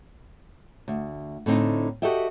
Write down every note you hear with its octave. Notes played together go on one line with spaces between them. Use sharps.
D2
A2 D3 C4 D#4
F#4 G4 A4 D#5 E5 G5